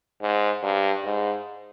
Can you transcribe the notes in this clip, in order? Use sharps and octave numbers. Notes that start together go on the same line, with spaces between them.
G#2
G2
G#2